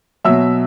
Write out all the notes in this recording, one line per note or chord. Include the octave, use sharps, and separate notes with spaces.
B2 F#3 E5 E6